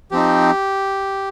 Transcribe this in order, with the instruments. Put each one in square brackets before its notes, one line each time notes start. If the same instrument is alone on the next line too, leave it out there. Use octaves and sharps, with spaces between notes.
[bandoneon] F3 C4 D#4 G4